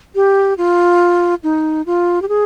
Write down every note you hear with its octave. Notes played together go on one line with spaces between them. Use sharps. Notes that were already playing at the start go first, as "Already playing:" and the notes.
G4
F4
D#4
F4
G4
G#4